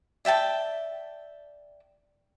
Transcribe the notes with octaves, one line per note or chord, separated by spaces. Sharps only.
D5 E5 G5 A5